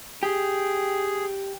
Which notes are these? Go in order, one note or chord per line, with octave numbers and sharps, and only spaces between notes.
G4 G#4